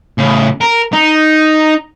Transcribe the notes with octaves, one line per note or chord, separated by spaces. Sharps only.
A2 C#3
A#4
D#4